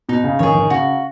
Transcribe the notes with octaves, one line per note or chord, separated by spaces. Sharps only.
B2 D#4
C#3
D#3 G#4 C#5
D#3
C#3 F#4